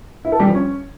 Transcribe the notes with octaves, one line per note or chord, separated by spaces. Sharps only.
E4
A4
G3
F3
C#4